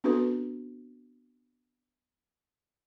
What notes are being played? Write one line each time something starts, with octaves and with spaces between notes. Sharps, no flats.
B3 C4 D4 F#4 A4 B4